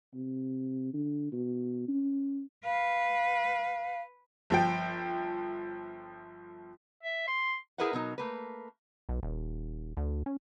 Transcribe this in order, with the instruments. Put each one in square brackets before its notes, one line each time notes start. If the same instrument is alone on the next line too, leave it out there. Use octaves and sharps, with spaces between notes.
[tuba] C3
D3
B2
C#4
[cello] B4 [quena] F5
[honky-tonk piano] G1 F3 G5
[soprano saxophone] E5
C6
[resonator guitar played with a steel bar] E4 G#4 A#4 B4 E5 F#5
B2 F#3 D#4 A#4
A3 A#3 B4
[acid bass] B1
D#1
D2
C#4